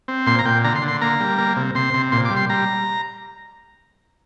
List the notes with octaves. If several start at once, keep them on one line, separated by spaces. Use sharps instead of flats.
C4
A#2 C6
A#5
A#2 G5
D3 A#5
C6
D3
C6
A#3 A#5
G3
A#3
C3
C3 C6
C3
A#2 C6
D6
G3
C6
G3 A#5